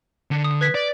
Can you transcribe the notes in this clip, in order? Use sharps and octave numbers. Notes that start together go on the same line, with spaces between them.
D3
D#6
B4 G#6 B6
D5